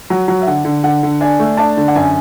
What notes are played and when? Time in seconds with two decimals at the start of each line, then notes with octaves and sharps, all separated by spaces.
0.10 F#3
0.28 F#3
0.41 E5
0.47 D3 F#5
0.65 D3
0.84 D3 F#5
1.03 D3
1.21 D4 G#5
1.40 A3
1.57 D4 A5
1.77 D3
1.88 F#5
1.95 F#2 G#5